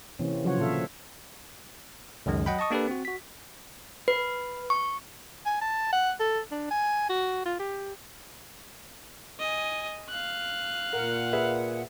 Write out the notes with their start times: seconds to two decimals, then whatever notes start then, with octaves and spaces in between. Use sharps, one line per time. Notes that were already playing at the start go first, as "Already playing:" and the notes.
0.19 C3 E3 A#3 C4 C#4
0.44 C#3 F3 F#3 F4 C#5 F#5
0.58 A#2 D3 F#3 A4 E5 F5
2.26 C#2 F#2 D#3 G#3
2.46 F#3 D#5 F#5 G5 B5
2.59 D#5 A5 C#6 D#6
2.71 A#3 D4 G4 A4 B4
2.87 C4 F#4
3.05 F#4 B6
4.08 B4
4.70 C#6
5.46 G#5
5.61 A5
5.93 F#5
6.20 A4
6.51 D4
6.71 G#5
7.09 F#4
7.45 F4
7.59 G4
9.40 D#5 G#5
10.09 F5 F#6
10.93 A#2 A#4 F#5
11.33 G#4 B4 E5